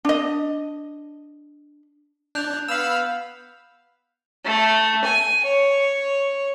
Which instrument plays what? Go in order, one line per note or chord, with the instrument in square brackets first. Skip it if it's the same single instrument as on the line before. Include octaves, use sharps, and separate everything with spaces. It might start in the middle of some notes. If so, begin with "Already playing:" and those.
[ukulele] D4 D#5
[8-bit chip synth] D4 [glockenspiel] F#6 G6 F7
[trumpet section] B3 F5 [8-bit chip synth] B5 E6 [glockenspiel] F7
[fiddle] A3
G#5
C#5